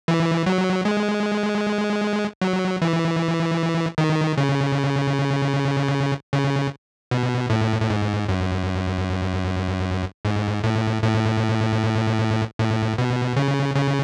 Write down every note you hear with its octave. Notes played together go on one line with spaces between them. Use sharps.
E3
F#3
G#3
F#3
E3
D#3
C#3
C#3
B2
A2
A2
G#2
F#2
G#2
A2
A2
A2
B2
C#3
C#3